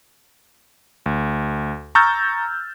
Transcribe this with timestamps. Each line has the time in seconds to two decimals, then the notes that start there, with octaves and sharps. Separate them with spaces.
1.06 D2
1.95 A#5 C#6 E6 F6 G6 A6